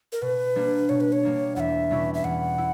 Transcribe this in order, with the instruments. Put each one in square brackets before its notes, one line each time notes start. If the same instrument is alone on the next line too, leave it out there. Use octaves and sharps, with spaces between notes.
[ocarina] A#4
[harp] B2 [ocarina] B4
[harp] G3 A#3 D4
[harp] B2 [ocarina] C#5
[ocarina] B4
C#5
[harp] G3 A#3 D4
[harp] E2 [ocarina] E5 F#5
[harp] B2 G3 C#4 E4
[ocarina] E5
[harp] E2 [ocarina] F#5
[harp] E4